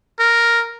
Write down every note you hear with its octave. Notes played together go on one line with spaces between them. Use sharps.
A#4